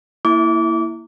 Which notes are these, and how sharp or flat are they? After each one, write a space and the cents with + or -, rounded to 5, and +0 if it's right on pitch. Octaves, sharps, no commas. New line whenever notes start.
A#3 +0 E4 +0 D6 -25